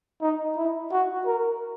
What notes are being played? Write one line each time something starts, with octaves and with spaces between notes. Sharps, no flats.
D#4
E4
F#4
A#4